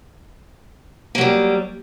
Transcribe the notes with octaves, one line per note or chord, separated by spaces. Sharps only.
F#3 G3 A#3